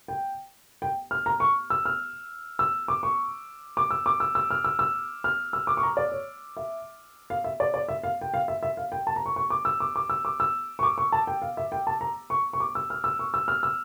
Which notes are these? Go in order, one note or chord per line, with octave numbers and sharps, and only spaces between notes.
G5
G5
F6
A#5
C#6
E6
F6
E6
D6
C#6
D6
E6
D6
E6
E6
F6
E6
E6
F6
E6
D6
C#6
A#5
D5
C#5
E5
F5
E5
D5
D5
E5
F5
G5
F5
E5
E5
F5
G5
A5
A#5
C#6
C#6
D6
E6
D6
D6
E6
D6
E6
C#6
D6
C#6
A5
G5
F5
E5
G5
A5
A#5
C#6
C#6
D6
E6
F6
E6
C#6
E6
F6
E6